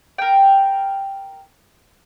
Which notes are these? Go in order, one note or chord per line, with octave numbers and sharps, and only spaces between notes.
A#4 G5